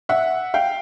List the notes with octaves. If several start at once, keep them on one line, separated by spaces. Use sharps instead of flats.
E5 F#5
F5 G5